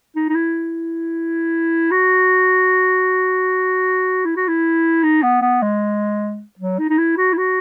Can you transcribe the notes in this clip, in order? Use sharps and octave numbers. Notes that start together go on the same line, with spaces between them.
D#4
D#4
E4
F#4
E4
F#4
E4
D#4
B3
B3
G#3
F#3
D#4
D#4
E4
F#4
E4
F#4